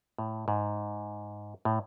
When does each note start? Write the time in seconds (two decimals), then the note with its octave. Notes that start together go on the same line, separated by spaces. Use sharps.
0.18 A2
0.48 G#2
1.65 A2